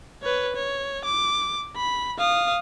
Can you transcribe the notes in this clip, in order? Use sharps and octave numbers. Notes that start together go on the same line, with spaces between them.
B4 C#5
C#5
D6
B5
F5 D#6